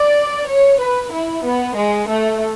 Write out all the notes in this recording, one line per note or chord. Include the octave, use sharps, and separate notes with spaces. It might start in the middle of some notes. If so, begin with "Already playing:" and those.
Already playing: D5
C#5
B4
E4
B3
G#3
A3